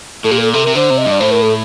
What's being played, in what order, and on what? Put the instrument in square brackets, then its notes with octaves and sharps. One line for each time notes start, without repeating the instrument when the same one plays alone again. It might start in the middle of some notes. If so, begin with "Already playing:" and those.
[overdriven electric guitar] A2 [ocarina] A4
[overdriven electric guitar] A#2 [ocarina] G4
[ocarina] A#4
A4
[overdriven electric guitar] C3 [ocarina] A4
[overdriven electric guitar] C3 [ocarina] A#4
[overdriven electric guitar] D3 [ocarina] C5
[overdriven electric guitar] C3
[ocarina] D#5
[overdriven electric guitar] G2
[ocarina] D5
[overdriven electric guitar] A2 [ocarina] C5
[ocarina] A#4
A4